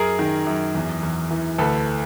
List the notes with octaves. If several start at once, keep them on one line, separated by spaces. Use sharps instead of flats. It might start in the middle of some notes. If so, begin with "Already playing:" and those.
Already playing: F#2 G#4 A#4
D#3
F#2
E2
E2
E3
D2 A4 B4